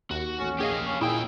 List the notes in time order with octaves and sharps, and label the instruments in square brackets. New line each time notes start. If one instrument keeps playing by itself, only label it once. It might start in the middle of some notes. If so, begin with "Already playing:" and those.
[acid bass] D#2 [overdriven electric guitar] F#4
[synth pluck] A1 [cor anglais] C#4
[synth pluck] A#1 G#4 D#5 [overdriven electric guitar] G4 F5
[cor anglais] C#4
[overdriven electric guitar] D#2 G5 [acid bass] A#2 [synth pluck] E4 [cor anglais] G#4